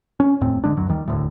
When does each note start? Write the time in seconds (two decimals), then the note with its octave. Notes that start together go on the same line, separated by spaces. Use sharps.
0.20 C#4
0.41 F1 D#2 A2 C4
0.64 F#1 D3 G#3 D4
0.77 D1 F#2 F#3
0.89 D#2 D#3 G3
1.08 E1 D2 A2